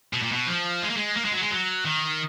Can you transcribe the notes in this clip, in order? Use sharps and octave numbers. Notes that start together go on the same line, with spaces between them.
B2
A#2
B2
F3
G#3
A#3
G#3
A#3
G#3
F#3
G#3
F#3
D#3